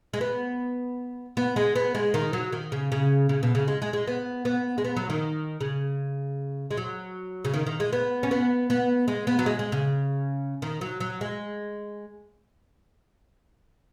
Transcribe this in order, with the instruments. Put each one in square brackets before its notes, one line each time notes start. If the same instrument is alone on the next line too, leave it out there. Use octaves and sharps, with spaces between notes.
[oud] G#3
B3
B3
G#3
B3
G#3
D#3
F#3
D#3
C#3
C#3
C#3
B2
C#3
G#3
G#3
G#3
B3
B3
G#3
B3
F#3
D#3
C#3
G#3
F#3
C#3
D#3
D#3
G#3
B3
C#4
B3
B3
G#3
B3
F#3
G#3
G#3
C#3
D#3
F#3
F#3
G#3